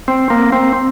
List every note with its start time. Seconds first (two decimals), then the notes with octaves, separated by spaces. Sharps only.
0.08 C4
0.30 A#3
0.52 C4